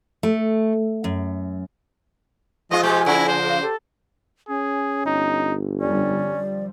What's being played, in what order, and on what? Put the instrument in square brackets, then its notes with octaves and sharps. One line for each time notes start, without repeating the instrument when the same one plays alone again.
[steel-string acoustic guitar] A3
F#2
[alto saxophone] F3 [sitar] G#3 F4 [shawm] D#5
[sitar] B2 G#3 [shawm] G4 [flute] G#5
[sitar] C#3 [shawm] E4
[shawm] C5
[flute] F5
[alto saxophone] G4 [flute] A4
[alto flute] C#4 [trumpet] G#4
[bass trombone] G1 [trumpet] D#4
[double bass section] F2 D3 G3 [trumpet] C#4 [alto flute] D5
[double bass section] F3 G3